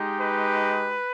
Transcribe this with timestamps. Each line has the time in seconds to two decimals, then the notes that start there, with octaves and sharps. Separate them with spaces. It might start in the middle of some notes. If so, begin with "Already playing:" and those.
Already playing: G#3 D#4 G4
0.20 B4